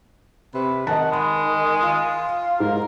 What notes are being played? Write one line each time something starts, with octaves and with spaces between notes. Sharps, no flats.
C3 B4
D#3 D#5 F#5 A5
G#3 B5
F4
G#2 A#4